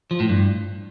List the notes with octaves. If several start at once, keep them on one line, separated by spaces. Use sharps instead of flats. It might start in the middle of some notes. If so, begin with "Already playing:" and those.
F3
A2
G2